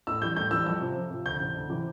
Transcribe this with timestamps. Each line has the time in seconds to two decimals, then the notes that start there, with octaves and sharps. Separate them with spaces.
0.07 A2 E6
0.21 E3 G3 G6
0.36 A2 G6
0.51 E3 G3 E6
0.66 F2 E6
0.81 C3 F3
0.96 F2
1.11 C3 F3
1.26 D2 G6
1.40 C3 E3
1.55 D2
1.70 C3 E3